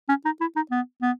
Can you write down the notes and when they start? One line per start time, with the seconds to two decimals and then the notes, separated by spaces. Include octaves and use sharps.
0.09 C#4
0.25 D#4
0.41 E4
0.56 D#4
0.71 B3
1.02 B3